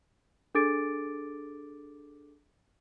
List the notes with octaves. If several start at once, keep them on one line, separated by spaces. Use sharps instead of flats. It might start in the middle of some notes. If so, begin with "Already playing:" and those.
D4 G#4 A4 D6 A6 D7